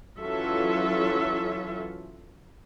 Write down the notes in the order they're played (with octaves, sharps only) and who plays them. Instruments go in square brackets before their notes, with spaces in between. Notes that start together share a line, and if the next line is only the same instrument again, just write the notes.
[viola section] E3 F#3 C#4 F4 A4 E5